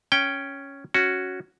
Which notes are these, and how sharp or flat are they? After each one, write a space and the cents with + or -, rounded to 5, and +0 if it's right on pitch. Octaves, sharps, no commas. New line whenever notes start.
C#4 +0 G5 +0
C#4 +0 F#4 +0